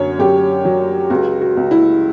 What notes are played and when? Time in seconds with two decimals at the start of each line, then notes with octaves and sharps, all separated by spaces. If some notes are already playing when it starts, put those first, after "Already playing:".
Already playing: F#2 D3 C#5
0.19 F#2 G4
0.65 F#3
1.10 C#2 F#4
1.41 F#4
1.57 C#2
1.71 E4